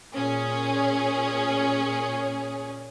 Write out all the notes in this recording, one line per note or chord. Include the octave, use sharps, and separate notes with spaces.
A#2 C#4 G#4